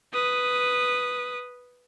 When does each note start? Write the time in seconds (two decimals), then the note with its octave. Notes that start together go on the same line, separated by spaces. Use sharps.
0.13 B4 D#6